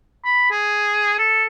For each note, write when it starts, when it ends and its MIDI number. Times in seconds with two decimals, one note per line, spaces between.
0.25 0.50 83
0.51 1.16 68
1.18 1.45 69